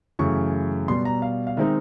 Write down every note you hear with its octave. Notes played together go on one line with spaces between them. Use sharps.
F#2 C#3 E3 A3 C#6
B2 G3 B3 C6
A#5
F5
F5
D#3 G#3 C4 D#4 E5